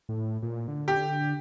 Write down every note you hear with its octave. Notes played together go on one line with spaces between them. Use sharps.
A2
A#2
D3
G4